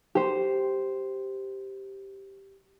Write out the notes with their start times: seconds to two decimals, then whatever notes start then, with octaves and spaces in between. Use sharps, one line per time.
0.15 G4 C5